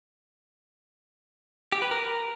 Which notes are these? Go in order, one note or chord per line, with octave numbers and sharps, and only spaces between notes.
G4
B4
A#4